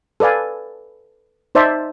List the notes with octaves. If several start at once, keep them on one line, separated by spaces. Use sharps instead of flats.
A4 B4 D5 F5 G#5
D#4 C5 D5 E5 A5